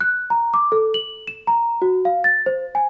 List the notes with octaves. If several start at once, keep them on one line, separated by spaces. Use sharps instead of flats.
F#6
A#5
D6
A4
F#7
E7
A#5
F#4
F5
A6
C5
G#5